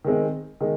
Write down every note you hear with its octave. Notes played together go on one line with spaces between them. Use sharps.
D#3 G#3 C4
D#3 G#3